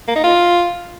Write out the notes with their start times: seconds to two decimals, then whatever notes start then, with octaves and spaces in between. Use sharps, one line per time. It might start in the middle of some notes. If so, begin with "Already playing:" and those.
0.08 A#3
0.16 D#4
0.24 F4